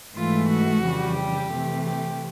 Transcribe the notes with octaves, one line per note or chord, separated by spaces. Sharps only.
G#2 E3 A3 F4
F#4
F2 C#3 E3 G3
G4
C3 E3 A3
G4